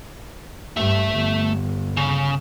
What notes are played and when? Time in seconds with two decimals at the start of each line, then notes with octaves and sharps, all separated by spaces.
0.77 G2 A3 E5
1.15 G1
1.97 C#3